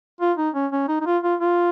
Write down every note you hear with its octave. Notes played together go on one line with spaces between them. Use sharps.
F4
D#4
C#4
C#4
D#4
D#4
F4
F4
F4